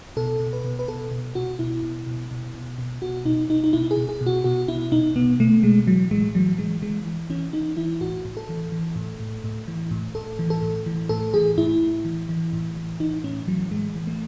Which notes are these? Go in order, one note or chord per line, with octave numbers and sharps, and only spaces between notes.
B2 A4
B2
B4
B2
B4
B2 A4
B2
B2 F#4
B2 E4
B2
B2
B2
B2
B2
B2 F#4
B2 D#4
B2 D#4
D#4
B2 E4
G#4
B2
G#4
B2
F#4
B2 F#4
B2 E4
B2 D#4
B2 B3
B2 A3
B2 G#3
E3 F#3
A2 G#3
E3 F#3
E3 G#3
E3 G#3
E3
E3 C#4
E3 D#4
E3 E4
A2 F#4
A2
A4
E3
E3
A2
A2
A2
E3
A2
A2 A4
E3
A4
A2
E3
A2 A4
E3 G#4
A2 E4
A2
E3
E3
A2
E3
E3 D#4
A2 C#4
E3 F#3
A2 G#3
E3
A3